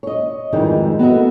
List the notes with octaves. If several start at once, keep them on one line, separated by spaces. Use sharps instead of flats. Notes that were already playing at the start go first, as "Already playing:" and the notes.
C#5 D#5
F2 G#2 D#3 E3 G3 G#3
B3 F#4 A4 D#5 E5